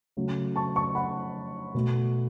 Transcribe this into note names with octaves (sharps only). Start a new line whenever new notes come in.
C#3 F#3 A3
A5 C#6
A5 C#6
F#5 B5
B2 A3